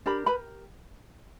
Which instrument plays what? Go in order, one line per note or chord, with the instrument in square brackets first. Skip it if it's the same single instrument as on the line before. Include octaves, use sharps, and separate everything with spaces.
[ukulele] D4 G4 A#4 B5
B4 B5